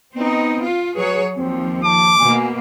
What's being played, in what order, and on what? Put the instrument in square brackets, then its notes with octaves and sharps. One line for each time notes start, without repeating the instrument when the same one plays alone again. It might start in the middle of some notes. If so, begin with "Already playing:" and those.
[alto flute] B3 [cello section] C4 D#4
[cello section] F4
[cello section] F#3 G#4 C#5 [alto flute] B4
[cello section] D#2 F3 [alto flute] C4
[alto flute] A5 [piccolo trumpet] D6
[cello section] B2 A#3 [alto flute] G#5